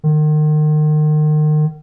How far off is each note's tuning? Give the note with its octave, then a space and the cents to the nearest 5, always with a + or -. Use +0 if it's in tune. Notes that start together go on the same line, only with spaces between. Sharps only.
D#3 -35